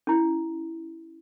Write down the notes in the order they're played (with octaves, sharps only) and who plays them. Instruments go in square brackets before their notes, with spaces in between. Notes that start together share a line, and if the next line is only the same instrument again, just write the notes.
[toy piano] C#4 E4